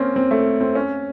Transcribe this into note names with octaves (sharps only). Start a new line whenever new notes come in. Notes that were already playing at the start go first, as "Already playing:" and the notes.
Already playing: A#3 C4 C#4
C4
A3
C4
C#4